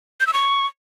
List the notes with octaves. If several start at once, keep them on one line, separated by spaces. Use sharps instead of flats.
G6
E6
C#6